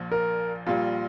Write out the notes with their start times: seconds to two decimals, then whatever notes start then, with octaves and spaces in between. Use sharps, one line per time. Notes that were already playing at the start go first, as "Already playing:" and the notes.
Already playing: A#1 A#2 F3
0.12 A#4
0.67 A#1 A#2 G3 F4